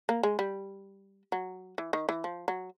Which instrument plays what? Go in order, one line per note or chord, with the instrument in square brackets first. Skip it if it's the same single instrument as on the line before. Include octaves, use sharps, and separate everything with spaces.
[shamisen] A#3
G#3
G3
F#3
E3
D#3
E3
F3
F#3